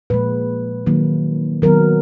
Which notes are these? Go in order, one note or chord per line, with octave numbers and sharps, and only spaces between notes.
A#2 F3 G#3 B4
D#3 F#3 A#3
D#3 F#3 B3 A#4